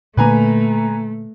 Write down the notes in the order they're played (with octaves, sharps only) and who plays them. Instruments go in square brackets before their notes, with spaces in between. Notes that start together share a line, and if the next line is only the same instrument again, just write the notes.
[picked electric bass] A#2 D3 A#3 [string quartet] A3 [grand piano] B4 G#5 A#5